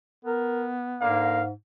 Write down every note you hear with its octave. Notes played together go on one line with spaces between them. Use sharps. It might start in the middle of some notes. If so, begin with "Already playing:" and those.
B3 A#4
G#2 D3 A#3 F5